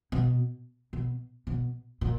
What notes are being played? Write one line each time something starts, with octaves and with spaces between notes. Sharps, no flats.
B2
B2
B2
A#2